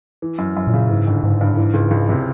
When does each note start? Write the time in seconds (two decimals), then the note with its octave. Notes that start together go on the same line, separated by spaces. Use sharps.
0.22 E3
0.38 F#2
0.57 F#2
0.67 A#2
0.73 C#3
0.89 G#2 E3
1.07 G1
1.23 G1 G#2
1.41 G2
1.57 E3
1.74 C#2
1.91 C#2
2.09 C3